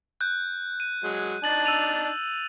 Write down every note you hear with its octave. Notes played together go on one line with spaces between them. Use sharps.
F#6 G6
D#7
F#3 G#3
D4 D#4 A5 A6 F#7
E6 D#7 F7